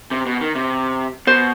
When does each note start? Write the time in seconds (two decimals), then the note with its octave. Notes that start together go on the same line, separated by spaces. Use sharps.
0.11 C3
0.26 B2
0.41 D#3
0.55 C3
1.27 B2 C5